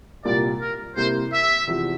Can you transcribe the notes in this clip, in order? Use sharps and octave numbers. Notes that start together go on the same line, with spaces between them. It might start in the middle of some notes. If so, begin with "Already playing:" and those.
C2 A#2 G3 A#3 D5
A#4
C3 G3 A#3 E4 A#4 C5
E5
E2 C3 F3